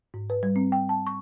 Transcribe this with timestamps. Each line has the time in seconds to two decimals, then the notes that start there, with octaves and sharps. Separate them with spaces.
0.14 G#2
0.30 B4
0.43 G3
0.56 C4
0.72 G5
0.89 A5
1.07 C#6